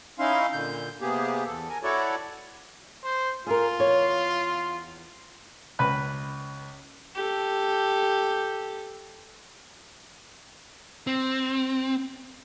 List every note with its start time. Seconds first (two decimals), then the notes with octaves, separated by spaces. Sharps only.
0.19 C#4 D#4 E4 F5 C6
0.53 A#2 D3 G6
1.01 C3 A#3 B3 G4 G#4
1.46 E2 A4
1.70 A#4 G#5
1.83 E4 F#4 A4 C#5 D5
3.04 C5
3.47 F4 G#4 A#4
3.78 E2 C#5
5.79 C#2 B4 B5 F#6
7.15 G4 A4
11.07 C4